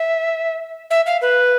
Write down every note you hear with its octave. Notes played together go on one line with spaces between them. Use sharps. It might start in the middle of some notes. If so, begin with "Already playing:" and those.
Already playing: E5
E5
F5
B4